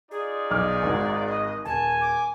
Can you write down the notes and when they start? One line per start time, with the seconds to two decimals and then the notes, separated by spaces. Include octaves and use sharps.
0.11 D#4 F4 G#4 D5
0.51 B1 D6 F6
0.83 G#1 G#2 F#4
1.26 D#5
1.65 D#1 G#5 A5
2.01 D6